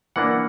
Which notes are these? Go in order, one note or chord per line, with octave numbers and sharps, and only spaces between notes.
E3 A#3 D4 F#5